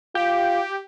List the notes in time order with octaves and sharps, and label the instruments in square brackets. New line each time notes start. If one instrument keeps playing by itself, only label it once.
[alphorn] F4 [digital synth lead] G4